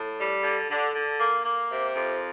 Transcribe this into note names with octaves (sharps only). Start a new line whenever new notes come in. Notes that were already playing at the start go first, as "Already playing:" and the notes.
Already playing: A2
G3
D3
D3
D3
A#3
A#3
C3
F2